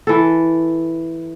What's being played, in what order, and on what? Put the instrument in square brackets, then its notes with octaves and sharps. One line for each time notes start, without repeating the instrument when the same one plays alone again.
[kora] E3 A4